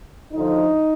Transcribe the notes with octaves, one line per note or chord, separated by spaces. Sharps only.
D2 D3 F3 D#4